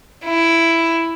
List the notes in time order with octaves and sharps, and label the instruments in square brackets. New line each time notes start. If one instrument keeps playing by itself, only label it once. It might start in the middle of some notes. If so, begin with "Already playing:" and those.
[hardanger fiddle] E4